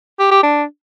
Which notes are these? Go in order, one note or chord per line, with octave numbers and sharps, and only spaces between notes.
G4
G4
D4